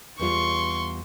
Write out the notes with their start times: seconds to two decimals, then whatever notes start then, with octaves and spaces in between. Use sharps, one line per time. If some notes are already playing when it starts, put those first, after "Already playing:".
0.19 E2 G3 F4 C6 C#6